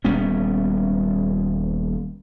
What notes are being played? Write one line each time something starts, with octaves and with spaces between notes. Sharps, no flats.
D#1 G3 B3 C#4